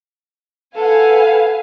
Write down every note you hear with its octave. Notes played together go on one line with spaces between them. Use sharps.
A4 B4 F5 F#5 G#5